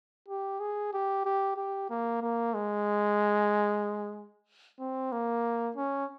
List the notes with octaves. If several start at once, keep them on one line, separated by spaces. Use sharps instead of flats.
G4
G#4
G4
G4
G4
A#3
A#3
G#3
C4
A#3
C#4